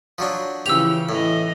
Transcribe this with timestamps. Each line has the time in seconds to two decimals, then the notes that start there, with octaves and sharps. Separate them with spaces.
0.18 F3 F#3 D4
0.66 C#3 E3 F3 G4 E6 F7
1.09 A2 E3 D#5